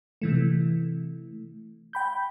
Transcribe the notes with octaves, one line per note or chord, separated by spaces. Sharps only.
C3 E3 A3
G5 B5 G6